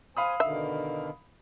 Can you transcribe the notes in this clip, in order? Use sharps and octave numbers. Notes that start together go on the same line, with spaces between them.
C5 F5 G#5 B5 D#6
B2 D3 D#3 E5